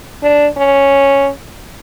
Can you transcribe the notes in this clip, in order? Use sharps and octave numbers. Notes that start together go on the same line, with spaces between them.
D4
C#4